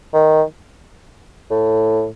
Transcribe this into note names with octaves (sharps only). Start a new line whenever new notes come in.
D#3
A2